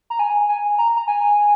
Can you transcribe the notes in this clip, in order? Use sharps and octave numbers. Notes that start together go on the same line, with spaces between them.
A#5
G#5
G#5
A#5
A#5
G#5